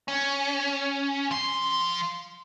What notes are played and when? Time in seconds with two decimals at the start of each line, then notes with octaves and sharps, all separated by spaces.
0.08 C#4
1.31 F3 C6